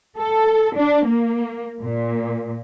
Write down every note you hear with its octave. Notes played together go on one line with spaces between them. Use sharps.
A4
D4
A#3
A#2